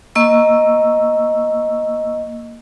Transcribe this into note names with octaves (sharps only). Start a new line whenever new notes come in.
A#3 D#5 C#6 E6